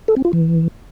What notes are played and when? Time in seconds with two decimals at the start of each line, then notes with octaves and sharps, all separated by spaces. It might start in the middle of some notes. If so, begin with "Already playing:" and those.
0.08 A4
0.16 C4
0.25 F4
0.33 E3